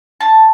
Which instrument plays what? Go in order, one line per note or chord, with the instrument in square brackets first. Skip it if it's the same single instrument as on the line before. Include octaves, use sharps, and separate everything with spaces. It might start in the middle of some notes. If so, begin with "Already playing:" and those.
[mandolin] A5